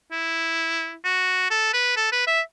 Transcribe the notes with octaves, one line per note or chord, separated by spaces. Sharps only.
E4
F#4
A4
B4
A4
B4
E5